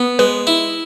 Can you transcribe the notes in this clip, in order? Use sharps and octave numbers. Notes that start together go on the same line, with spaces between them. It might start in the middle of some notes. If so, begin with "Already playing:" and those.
Already playing: B3
G#3 B4
E4